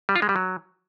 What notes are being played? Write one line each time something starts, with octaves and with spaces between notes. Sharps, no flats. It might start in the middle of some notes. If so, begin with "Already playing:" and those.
G3
F4
G#3
G3
F#3